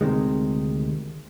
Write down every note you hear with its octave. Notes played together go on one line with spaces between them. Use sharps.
D2 C3 D#3 G#3